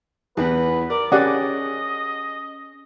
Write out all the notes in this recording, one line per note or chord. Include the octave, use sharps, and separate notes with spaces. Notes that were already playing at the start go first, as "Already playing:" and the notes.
E2 E3 B3 B4
A#4 D5
C#4 G4 G#4 D5 D#5 F#5